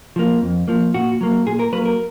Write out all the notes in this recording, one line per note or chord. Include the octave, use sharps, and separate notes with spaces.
F3 A#3
F2
F3 A#3
A#2 F#4
F#3 A#3
A#2 G#4
A#4
F#3 A#3 B4
A#4